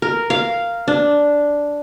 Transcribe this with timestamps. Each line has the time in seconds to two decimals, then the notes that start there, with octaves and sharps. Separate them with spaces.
0.02 A#4
0.30 F5
0.88 D4